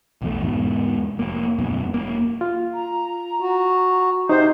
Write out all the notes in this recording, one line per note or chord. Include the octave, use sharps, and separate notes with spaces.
B1 E2 E3 A3
E2 G#2 B2
F1 A#3
E1 F#2 B2
E1 A#3
F4
A#5
F#4
C3 D#4 C5